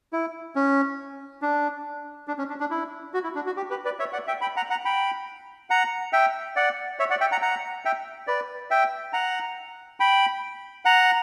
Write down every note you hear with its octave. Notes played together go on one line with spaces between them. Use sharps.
E4
C#4
D4
D4
C#4
D4
D4
E4
F#4
E4
D4
F#4
G4
G4 B4
B4 D5
C#5 E5
D5 F#5
E5 G5
G5 B5
F#5 A#5
F#5 A#5
G5 B5
F#5 A#5
E5 G5
D5 F#5
C#5 E5
D5 F#5
E5 G5
F#5 A#5
F#5 A#5
E5 G5
B4 D5
E5 G5
F#5 A#5
G5 B5
F#5 A#5